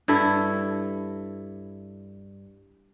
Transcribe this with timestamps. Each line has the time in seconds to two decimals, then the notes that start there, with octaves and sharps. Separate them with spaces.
0.08 G2 E4 A4